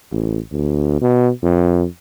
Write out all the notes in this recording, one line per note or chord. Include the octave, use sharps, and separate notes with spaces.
A1
D2
B2
F2